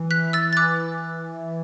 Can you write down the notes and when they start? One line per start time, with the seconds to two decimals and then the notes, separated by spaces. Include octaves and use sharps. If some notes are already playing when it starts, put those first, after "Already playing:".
Already playing: E3
0.11 F#6 B6
0.33 E6 A6
0.53 A6
0.57 D6 F#6